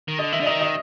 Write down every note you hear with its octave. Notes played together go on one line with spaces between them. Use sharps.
D#3
D3 D#5
D#3 E5
D3 D5
D#3 D#5
D#5